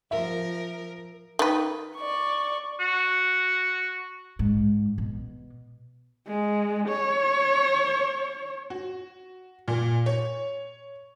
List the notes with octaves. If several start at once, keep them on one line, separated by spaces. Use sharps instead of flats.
F3 A#4 E5
D#3 B4
D5 C#6
F#4
G#2
B2
G#3
C#5
F#4
A#2
C#5